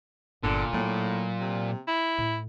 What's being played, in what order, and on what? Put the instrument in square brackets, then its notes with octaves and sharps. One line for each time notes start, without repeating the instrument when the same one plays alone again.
[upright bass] G1 [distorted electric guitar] A#2 [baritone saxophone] D3
[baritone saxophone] A2 [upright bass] F#3 A#3
[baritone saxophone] C3
E4
[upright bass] A2